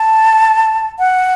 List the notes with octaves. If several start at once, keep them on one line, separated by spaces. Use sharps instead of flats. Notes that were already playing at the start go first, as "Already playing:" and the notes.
Already playing: A5
F#5